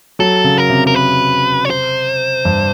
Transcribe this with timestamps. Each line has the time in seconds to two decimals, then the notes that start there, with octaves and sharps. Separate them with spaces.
0.19 F#3 A4
0.44 C#3
0.58 A#4
0.70 C3
0.87 A#4
0.95 B4
1.65 C#5
1.70 C5
2.45 G2